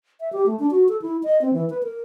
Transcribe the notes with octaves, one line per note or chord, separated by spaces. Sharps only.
E5
G4
A3
D4
F#4
A4
E4
D#5
C4
E3
B4
A#4